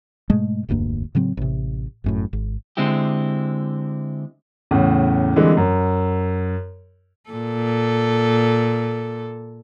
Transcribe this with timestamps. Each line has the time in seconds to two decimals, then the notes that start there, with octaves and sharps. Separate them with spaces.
0.30 G#2 B2 G#3 A3
0.69 E1 D2 G2 A#3
1.15 A2 C#3 F#3 C4
1.37 A1 C3
2.04 G1 F#2 A2
2.33 G#1
2.77 D3 G#3 C4 E4 G4
4.71 E2 A2 C#3
5.36 D3 E3 G3 G#3 C4
5.57 F#2
7.30 A#2 A4